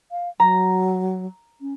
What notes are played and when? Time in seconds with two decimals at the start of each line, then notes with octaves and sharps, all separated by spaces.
0.11 F5
0.40 F#3 A#5
1.61 C#4